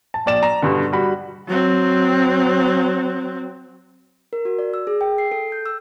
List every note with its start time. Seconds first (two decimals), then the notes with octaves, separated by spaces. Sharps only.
0.14 A5
0.26 A#1 D5 E7
0.43 A#5
0.62 G2 B2 D3
0.92 G3 F#4 B5
1.48 F#3 C4
4.33 A#4
4.45 F#4
4.59 D5
4.74 E6
4.87 G#4
5.01 G5
5.18 C7
5.32 A4
5.52 G6
5.66 E6